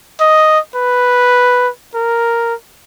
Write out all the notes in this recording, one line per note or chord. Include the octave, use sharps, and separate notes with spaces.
D#5
B4
A#4